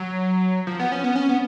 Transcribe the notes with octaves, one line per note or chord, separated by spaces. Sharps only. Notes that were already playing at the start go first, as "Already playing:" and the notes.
Already playing: F#3
F3
B3
C#4
B3
C#4
B3